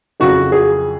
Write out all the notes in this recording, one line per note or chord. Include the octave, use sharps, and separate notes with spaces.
F2 C#3 F#3 F#4
G#4